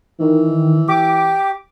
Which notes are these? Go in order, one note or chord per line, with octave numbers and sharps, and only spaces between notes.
D#3 E3
G4 D6